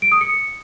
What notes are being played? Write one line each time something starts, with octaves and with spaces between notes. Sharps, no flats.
D7
D#6
C#7